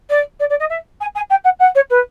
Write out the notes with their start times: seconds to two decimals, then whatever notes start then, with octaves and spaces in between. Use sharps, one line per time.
0.10 D5
0.40 D5
0.50 D5
0.60 D#5
0.70 E5
1.01 G#5
1.15 G#5
1.30 G5
1.44 F#5
1.59 F#5
1.75 C#5
1.90 B4